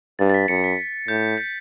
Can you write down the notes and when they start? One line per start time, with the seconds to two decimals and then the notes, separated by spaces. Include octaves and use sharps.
0.19 G2 A6
0.30 A6
0.34 B6
0.48 F#2 C#7
0.64 B6
1.08 A2 G6
1.38 A6